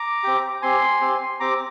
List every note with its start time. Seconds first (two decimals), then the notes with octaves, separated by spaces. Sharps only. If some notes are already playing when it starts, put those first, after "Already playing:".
Already playing: A#5 D6
0.23 C4 G4
0.62 C4 G4 G#5 C6
1.01 C4 G4
1.40 C4 G4 A#5 D6